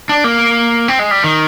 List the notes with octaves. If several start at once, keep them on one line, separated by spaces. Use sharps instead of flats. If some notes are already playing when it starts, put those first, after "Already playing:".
D4
A#3
C4
G#3
G3
D#3